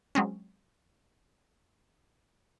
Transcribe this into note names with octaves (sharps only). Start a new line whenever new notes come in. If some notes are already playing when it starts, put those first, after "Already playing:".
F#3 G#3 C4 C#4